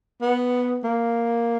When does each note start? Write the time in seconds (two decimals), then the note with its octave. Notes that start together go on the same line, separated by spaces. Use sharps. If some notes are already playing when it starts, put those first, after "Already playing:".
0.21 B3
0.84 A#3